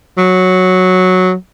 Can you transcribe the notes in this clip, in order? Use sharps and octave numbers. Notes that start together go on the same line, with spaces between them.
F#3